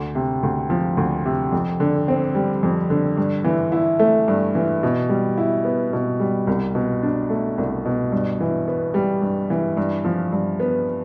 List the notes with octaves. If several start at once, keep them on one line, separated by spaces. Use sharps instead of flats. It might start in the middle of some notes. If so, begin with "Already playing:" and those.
Already playing: D2
C3
D2
F3
D2
C3
F2
D3
C4
G3
F2
D3
G2
E3
E4
A3
G2
E3
B2
G3
E4
B3
B2
G3
C2
B2
D4
A3
C2
B2
G2
E3
B3
G3
G2
E3
G2
F3
G2
B3